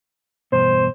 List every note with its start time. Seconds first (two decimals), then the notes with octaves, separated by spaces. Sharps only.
0.52 E2 G2 B2 C5